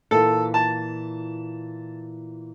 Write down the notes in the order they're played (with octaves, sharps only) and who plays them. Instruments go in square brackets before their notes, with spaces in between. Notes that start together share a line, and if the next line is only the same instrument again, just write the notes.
[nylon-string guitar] A#2 E3 F4 [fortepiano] A4
[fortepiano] A5